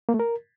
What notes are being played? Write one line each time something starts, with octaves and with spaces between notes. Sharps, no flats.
A#3
A3
A#4